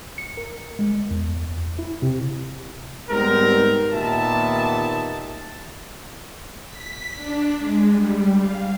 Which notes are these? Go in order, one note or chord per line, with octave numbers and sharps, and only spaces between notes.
C#7
A#4
G#3
E2
E4
C3
G#2 G3 B3 C4 A#4
D#2 A#2 D#3 B3 E5 A5
B6
D4
G#3
G3
F5